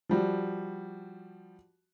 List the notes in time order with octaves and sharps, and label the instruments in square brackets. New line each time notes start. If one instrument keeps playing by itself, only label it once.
[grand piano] F3 G3 F#4